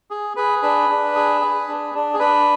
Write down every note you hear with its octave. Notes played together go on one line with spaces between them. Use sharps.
G#4
G#4 B4
D4 B4
D4
G#4
G#4
D4
D4
G#4
D4 B4